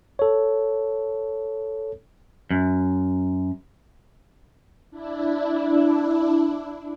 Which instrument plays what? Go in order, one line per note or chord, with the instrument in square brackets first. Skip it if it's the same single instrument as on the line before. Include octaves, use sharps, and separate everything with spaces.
[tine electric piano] A4 C#5
[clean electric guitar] F#2
[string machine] D4 E4